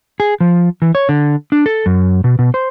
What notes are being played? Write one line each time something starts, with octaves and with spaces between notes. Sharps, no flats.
G#4
F3
E3
C#5
D3
D4
A4
F#2
B2
B2
C5